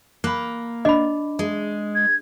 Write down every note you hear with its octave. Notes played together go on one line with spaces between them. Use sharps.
A#3 B5 F#6
D4 D#5 B5
G#3
G#6